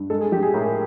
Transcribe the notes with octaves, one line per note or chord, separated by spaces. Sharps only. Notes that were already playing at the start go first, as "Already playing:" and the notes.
Already playing: G2
G#3 A4
G#4
F3 G4
G#4
A2 A#4